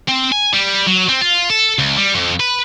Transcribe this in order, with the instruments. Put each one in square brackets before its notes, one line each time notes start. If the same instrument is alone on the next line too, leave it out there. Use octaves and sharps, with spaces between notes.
[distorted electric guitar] C4
G#5
G3
F#3
C4
F4
A4
C#2
G3
F2
B4